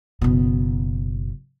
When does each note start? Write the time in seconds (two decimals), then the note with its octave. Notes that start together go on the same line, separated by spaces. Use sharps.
0.22 F#1 B2